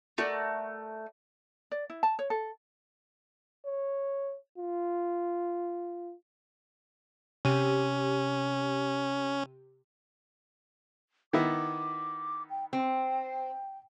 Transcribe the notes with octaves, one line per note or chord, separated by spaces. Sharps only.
A3 F#4 A#4 D5
D5
E4
A5
C#5
A4
C#5
F4
C3 C#4 G4 D#7
D#3 B3 E4 D6
G5
C4 G5